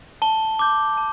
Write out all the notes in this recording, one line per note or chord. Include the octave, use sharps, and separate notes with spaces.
A5 G7
D6 G6
A5